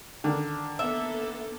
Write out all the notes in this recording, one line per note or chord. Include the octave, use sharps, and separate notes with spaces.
D3 D#3
A#3 B3 A4 E5